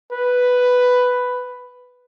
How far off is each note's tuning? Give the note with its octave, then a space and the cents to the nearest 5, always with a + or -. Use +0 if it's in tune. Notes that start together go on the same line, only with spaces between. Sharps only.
B4 +5